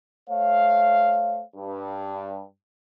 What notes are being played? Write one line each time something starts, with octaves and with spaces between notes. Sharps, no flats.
A3 C5 C#5 F5
G2